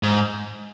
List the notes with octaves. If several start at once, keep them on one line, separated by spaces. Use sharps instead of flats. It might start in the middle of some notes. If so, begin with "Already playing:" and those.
G#2